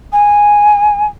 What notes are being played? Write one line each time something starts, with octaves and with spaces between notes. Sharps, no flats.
G#5